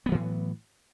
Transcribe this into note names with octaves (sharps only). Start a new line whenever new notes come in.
A2 E3 F#3 B3